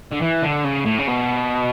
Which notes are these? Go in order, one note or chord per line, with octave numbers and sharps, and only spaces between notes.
D3
E3
D3
C#3
A2
C#3
B2